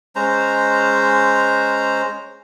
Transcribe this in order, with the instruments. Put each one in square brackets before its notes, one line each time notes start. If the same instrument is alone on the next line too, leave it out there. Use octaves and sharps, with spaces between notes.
[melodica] G#3 C#4 C5 A#5